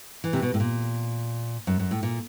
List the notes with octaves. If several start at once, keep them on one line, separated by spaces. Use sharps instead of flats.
E3
C3
B2
A2
A#2
F#2
F#2
A2
A#2